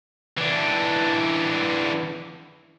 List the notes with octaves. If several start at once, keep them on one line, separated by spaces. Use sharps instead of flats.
E3 D4